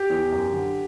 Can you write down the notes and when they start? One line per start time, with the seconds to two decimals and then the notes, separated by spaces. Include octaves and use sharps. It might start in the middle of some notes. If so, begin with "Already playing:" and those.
Already playing: G4
0.10 E2
0.32 F#2
0.53 D3